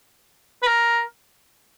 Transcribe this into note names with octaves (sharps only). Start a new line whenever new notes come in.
B4
A#4